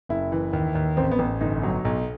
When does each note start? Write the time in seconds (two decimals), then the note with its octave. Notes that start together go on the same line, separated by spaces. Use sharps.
0.09 F#1 E4
0.32 E3
0.53 D#2
0.75 D#2
0.97 A1 C4
1.11 B3
1.19 A1
1.41 G1 D#4
1.63 F#3
1.85 B1